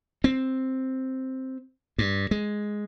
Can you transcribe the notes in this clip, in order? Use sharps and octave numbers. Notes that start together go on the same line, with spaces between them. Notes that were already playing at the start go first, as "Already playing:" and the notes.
C4
G2
G#3